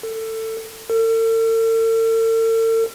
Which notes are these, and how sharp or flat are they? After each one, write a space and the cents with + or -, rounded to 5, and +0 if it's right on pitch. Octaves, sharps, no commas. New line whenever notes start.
A4 +20
A4 +45